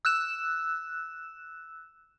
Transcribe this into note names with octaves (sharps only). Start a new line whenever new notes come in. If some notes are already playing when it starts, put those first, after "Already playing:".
E6 F#6 E7